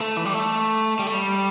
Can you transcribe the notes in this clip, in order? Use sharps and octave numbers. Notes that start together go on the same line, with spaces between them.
A3
E3
G3
A3
G3
A3
G3